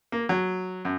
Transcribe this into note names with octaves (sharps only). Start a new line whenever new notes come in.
A#3
F#3
F#2